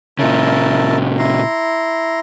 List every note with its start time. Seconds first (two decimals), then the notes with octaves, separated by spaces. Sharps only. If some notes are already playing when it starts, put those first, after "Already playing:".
0.19 A#2 C#3 E4 A#4 A5
1.18 E4 A#5 C6